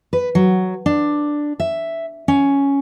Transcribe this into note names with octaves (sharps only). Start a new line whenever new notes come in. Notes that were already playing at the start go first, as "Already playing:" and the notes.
B4
F#3
D4
E5
C#4